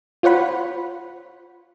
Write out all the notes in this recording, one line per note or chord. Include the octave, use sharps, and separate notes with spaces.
F4 C5 C#5 F#5 B5